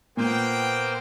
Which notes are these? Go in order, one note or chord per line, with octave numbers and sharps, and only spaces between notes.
A#2 A#3 B3 C5 G5